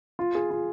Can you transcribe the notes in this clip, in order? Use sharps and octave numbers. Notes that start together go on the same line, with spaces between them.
F4
G#4
F4